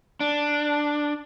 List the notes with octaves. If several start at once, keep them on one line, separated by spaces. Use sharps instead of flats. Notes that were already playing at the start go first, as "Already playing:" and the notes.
D4